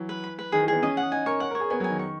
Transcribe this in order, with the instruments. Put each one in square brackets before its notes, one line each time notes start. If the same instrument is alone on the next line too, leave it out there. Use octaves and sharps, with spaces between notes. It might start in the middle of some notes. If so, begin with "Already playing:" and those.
Already playing: [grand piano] E3 F#3
[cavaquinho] B4
B5
B4
[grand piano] D#3 [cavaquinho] G#4
[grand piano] E3
[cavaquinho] G#4
[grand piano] B3
[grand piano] C#4 [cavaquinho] D#5
[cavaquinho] F#5
[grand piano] D#4 [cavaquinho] G#5
[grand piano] A#4 [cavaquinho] C#5
[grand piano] A#4 [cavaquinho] F#5
[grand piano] A#4
[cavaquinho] C#5
[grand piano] G#4
[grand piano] B3 [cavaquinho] G#5
[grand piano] F#3
[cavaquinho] G#5
[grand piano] D#3
[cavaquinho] C#6